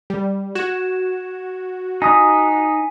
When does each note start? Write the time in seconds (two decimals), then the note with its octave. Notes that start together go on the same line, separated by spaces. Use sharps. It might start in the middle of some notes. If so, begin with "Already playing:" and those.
0.10 G3
0.55 F#4 G#6 E7
2.02 D#4 G#5 D#6 B6